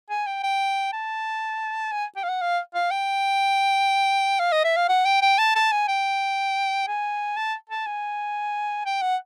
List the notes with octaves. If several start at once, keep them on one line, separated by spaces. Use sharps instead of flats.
G#5
G5
G5
A5
G#5
G5
F5
F#5
F5
F5
G5
F5
D#5
E5
F5
F#5
G5
G5
A5
A5
G#5
G5
G#5
A5
A5
G#5
G5
F#5